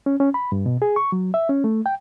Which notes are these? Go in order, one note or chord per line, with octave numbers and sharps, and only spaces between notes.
C#4
C#4
B5
G2
B2
G#4
C#6
F#3
E5
C#4
A3
G5